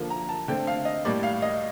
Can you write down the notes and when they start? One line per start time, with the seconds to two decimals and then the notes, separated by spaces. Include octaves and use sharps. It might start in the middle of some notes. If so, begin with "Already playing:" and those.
Already playing: D3 F3 A#3
0.10 A#5
0.29 A5
0.48 D3 A3 C4 G5
0.67 F5
0.85 D#5
1.05 A2 G3 A#3 D5
1.23 F5
1.42 D#5